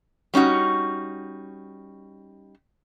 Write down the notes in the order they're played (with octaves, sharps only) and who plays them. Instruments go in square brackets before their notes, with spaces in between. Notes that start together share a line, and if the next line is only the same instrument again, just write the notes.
[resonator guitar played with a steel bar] G3 C#4 D#4 F#4